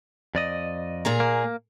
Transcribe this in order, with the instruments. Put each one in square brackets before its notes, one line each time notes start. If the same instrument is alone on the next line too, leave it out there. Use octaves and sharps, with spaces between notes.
[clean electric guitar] F2 D5 D#5
[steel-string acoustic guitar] A#2 G#4 A#5
[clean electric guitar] A#3